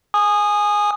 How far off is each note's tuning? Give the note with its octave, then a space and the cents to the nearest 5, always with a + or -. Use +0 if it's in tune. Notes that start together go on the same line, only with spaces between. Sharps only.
G#5 +0 D#6 -15